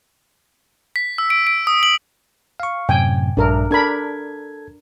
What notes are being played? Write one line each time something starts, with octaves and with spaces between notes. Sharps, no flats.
B6
E6
D7
D7
D#6
F#7
F5 C#6
F#2 A2 C3 G5 G#5
A#1 G2 D4 A#4 E5
D4 A4 A#4 B5 G#6